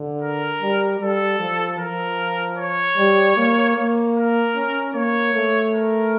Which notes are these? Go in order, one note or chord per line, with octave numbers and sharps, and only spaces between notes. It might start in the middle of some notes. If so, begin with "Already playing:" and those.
Already playing: D3
A#4
G3
G3 A4
F3
F3 A#4
C#5
G3
A#3
A#3
A#4
C#4
A#3 C#5
A3
A#4